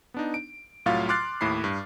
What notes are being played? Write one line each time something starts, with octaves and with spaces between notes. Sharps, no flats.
B3 D4 D#4
D7
C2 A2 F#3 F4 F5 A6
C6 D6 F6 F#6 A6 C7
D#2 A2 E4 B5 C7
G2